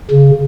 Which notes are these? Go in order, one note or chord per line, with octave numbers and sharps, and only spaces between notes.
C#3